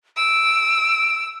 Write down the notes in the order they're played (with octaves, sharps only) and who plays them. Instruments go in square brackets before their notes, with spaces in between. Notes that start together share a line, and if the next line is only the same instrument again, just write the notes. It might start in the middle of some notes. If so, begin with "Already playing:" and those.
[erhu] E6 [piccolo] D7